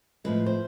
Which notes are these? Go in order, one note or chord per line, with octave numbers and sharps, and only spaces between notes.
A2 F3 G#3 B4
C5